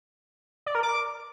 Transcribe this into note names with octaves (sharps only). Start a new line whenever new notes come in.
D5
A#4
D6